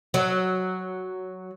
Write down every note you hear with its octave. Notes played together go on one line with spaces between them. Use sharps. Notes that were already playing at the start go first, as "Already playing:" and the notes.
F#3